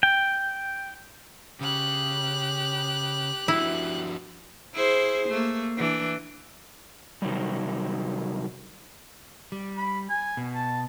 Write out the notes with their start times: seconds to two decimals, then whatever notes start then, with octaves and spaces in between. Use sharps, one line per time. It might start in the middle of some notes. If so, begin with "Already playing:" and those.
0.03 G5
1.61 C#3 G4 F#6
3.48 F3 D4 E4 F#4
4.74 E4 G#4 C5
5.29 A3 A#3
5.77 E3 D4
7.22 C3 D#3 F#3 G3
9.52 G3
9.77 B5
10.09 G#5
10.37 B2
10.55 A5